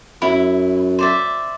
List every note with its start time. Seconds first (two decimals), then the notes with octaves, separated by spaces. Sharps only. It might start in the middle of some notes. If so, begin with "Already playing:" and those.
0.22 F#2 E4
0.99 C5 D5 E5